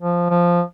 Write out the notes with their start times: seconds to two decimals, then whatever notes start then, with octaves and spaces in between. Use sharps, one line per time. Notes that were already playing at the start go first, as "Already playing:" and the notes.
0.01 F3
0.30 F3